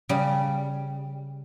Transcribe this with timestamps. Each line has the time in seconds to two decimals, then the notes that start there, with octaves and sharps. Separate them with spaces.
0.09 C#3 G3